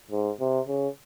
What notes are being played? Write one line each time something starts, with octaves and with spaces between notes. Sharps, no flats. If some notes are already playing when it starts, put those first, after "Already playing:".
G#2
C3
C#3